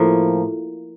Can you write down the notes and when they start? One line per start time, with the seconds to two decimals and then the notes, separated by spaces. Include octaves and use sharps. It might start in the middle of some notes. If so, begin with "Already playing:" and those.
Already playing: A2 F3 A#3